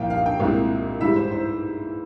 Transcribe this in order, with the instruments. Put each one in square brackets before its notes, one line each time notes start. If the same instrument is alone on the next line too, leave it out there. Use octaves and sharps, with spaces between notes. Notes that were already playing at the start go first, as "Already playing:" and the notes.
Already playing: [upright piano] C2 A#2 F3 F5 G5
F5
G5
C2 A#2 G#3 C4
G#2 E3 G3 E5
C5
C5